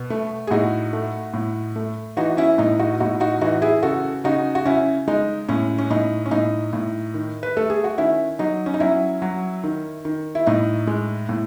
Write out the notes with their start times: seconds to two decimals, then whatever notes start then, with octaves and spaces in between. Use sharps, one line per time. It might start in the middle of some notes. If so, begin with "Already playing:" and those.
Already playing: B2
0.10 A3
0.47 G#4
0.51 A2 D#4 F#4
0.93 A3
1.34 A2
1.76 A3
2.17 E3 D#4 F#4
2.37 C#4 E4
2.58 A2 D#4
2.79 D#4 F#4
3.00 A2 D#4 F#4
3.20 D#4 F#4
3.41 E3 D#4 F#4
3.62 E4 G#4
3.83 C#3 F#4 A4
4.24 C#3 D#4 F#4
4.55 F#4
4.65 C#3 C#4 E4
5.08 G#3 D#4
5.49 A2 C#4
5.78 C#4
5.90 A2 D#4
6.26 C#4
6.31 A2 D#4
6.73 A2
7.14 D#3
7.43 B4
7.57 A3 A4
7.70 G#4
7.84 F#4
7.98 D#3 C#4 E4
8.39 F#3 D#4
8.66 C#4
8.74 D#4
8.80 F#3 C#4 E4
9.22 F#3
9.64 D#3
10.05 D#3
10.35 E4
10.46 A2 D#4
10.87 G#3
11.29 A2